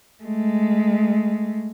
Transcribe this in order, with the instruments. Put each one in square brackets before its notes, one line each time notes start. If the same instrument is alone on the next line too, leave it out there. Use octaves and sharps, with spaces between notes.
[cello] G#3 A3